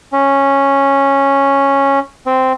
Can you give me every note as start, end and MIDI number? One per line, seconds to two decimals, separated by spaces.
0.13 1.99 61
2.26 2.52 60